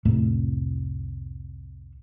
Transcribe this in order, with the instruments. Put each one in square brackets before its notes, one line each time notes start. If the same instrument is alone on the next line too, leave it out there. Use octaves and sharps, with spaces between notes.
[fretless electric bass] C2 F2 A2 A3